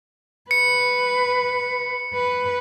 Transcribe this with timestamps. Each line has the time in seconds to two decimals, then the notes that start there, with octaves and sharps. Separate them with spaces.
0.51 B4 C#7
2.14 B4